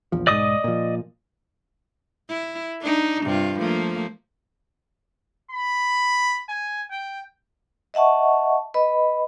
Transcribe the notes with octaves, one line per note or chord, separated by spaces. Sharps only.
A#1 E2 F3
B1 G#2 D5 D#5 D#6
A#2 F3
E4
D4 D#4
G2 C3 F4
F3 A3 A#3
B5
G#5
G5
D#5 E5 F#5 A5 C#6
B4 D#5 B5